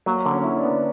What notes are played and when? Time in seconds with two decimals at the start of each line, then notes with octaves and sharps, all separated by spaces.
0.06 F#3 A#3
0.26 D3
0.32 C#4
0.44 E4
0.57 D4
0.63 B3